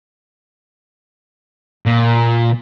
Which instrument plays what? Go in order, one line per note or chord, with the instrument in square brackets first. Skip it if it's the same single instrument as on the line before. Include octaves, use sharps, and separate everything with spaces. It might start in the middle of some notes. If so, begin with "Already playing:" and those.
[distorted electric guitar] A#2